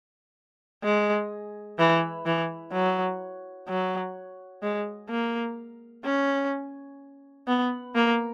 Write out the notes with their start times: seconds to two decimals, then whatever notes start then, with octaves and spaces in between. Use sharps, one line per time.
0.84 G#3
1.79 E3
2.26 E3
2.73 F#3
3.69 F#3
4.63 G#3
5.10 A#3
6.05 C#4
7.48 B3
7.95 A#3